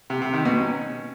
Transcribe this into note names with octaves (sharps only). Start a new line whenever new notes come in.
C3
C3
D#3
B2
C#4